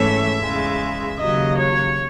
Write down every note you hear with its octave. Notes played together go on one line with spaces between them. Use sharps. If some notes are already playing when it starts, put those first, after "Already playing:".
Already playing: G#2 E3 A3 C#4 E5
E2 C#3 G#3
D#2 C#3 F#3 D#5
C#5